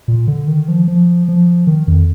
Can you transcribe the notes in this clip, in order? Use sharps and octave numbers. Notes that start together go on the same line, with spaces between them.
A#2
D3
D#3
F3
F3
F3
D#3
F2